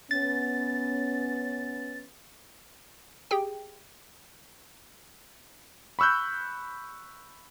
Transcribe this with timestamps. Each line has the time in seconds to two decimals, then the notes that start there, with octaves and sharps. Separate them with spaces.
0.11 B3 C#4 A6
3.31 G4 G#4 G5
5.99 B5 C#6 E6 F#6 G6